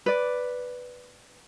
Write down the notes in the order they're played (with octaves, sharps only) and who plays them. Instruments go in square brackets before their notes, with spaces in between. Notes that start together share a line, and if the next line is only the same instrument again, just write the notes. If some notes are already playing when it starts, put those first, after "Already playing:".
[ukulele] B4 D5